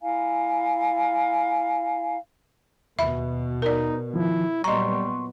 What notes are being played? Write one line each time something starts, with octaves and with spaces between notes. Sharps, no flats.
E4 F5 G#5 A#5
D#2 B2 E5 B5
D#4 A#4 D5
D#3 F3 E4
A#2 F#3 G3 B3 D#5 A#5 C6 C#6